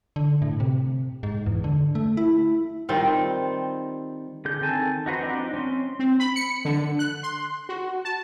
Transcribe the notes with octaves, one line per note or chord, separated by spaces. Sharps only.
D3
A2
C3
G#2
E2
D3
A3
E4
D#3 G3 C4 F4
D3 G#4 G6
D#3 C4 A4 G#5 A5
D#4 F#4 B4 C5
F3 C4 D4 D#4
C4 C#4 C6
C4
B5
C#7
D3
F#6
C6
F#4
A5